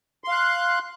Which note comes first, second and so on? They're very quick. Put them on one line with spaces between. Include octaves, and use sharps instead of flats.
C6 F5 F#6